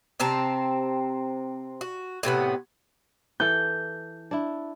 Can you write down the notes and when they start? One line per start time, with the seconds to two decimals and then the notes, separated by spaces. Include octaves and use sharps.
0.20 C3 C4 A5 A#5
1.81 F#4
2.23 A2 C3 B3 F#5
3.40 E3 A4 G6
4.31 D4 E4